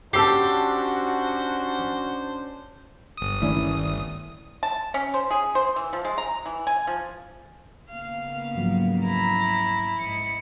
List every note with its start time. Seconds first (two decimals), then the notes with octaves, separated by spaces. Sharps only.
0.13 C#4 D4 F#4 G4 C5 A5 E6 C7
3.17 G1 D#6
3.42 D#1 D#3 A3 C#4 D4 E4
4.63 A5
4.94 C#4
5.14 C5
5.30 G#4
5.55 C5
5.76 E3
5.93 F3
6.05 G#3
6.18 A#5
6.46 E3
6.67 G#5
6.87 F3
7.90 C#3 A#3 B3 F5
8.55 G#2 F3 F#3
9.04 E4 A#5
10.00 G#2 D#5 C#7